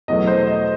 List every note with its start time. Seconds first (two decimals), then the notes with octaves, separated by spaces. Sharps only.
0.08 E2 B2 F#3 A3 D#5
0.27 C5
0.47 D#5